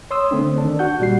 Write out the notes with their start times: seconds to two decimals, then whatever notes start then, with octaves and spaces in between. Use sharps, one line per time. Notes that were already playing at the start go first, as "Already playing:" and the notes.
0.11 C#5 C6 D#6 E6
0.31 D3 A3 C4 D4
0.58 D#3 D4
0.79 F#4 F#5 G6
1.00 A#2 G3 C7